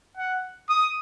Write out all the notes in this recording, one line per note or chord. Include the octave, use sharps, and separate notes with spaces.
F#5
D#6